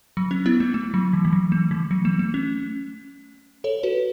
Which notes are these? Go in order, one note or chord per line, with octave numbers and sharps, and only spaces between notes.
F#3
C#4
B3 E4
A3
A3
F#3
E3
E3
F#3
A3
E3
F#3
A3
A3
C#4
A4 C#5
F#4 B4